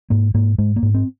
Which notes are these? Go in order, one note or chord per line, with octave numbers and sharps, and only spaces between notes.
G#2 A#3
G#2 A#3
G#2 G#3
A#3
G#2
C4